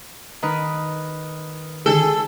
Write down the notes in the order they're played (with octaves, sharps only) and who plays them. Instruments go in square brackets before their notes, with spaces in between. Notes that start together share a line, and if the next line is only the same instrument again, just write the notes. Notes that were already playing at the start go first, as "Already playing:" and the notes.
[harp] D#3 D#4 B4
[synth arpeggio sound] D3 D#3 G#3 [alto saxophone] G#4 [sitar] A4